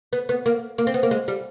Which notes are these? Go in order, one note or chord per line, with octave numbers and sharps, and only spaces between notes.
B3
B3
A#3
A#3
C4
B3
A#3
G#3
G3